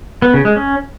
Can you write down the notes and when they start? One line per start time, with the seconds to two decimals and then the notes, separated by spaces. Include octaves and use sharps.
0.22 B3
0.34 C#3
0.45 G#3
0.56 C#4